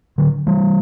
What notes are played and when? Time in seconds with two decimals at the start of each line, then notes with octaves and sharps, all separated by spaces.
0.18 D3 F#3
0.47 E3 G3